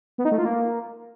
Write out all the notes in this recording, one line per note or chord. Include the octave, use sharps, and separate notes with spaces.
B3
D#4
A3
F4
A#3